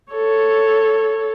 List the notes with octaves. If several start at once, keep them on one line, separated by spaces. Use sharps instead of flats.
A4 C#5